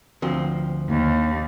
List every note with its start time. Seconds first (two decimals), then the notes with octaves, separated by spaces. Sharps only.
0.22 D2 F3 C4
0.89 D#2